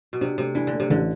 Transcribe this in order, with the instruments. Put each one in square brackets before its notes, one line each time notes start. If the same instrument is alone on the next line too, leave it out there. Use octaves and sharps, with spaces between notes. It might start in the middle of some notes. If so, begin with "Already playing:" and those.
[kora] B2
[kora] C3 [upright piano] D4
[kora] C3 [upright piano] A3
[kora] E3 [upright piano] D4
[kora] D3
[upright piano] A3
[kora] C3
[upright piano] A1 [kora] D3